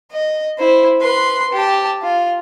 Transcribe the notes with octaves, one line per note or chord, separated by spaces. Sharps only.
D#5
E4 C5
B4 C6
G4 A5
F4